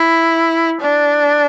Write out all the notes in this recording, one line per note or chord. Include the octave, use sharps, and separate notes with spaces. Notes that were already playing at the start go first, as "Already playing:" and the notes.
Already playing: E4
D4